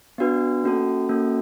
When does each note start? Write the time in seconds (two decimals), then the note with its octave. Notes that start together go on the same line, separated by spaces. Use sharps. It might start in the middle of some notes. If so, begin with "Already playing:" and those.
0.18 B3 D4 F#4 B4
0.64 A#3 C#4 F#4 A4
1.09 A#3 C#4 F#4 A4